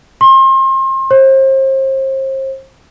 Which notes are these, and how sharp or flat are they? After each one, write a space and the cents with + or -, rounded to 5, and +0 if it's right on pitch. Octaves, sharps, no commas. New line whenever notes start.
C6 +35
C5 +35